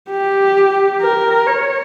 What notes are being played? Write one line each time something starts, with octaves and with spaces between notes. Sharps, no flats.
G4
A#4
C#5